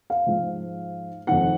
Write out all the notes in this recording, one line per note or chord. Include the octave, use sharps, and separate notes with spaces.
F5
G#2 F3
F2 D#3 F#5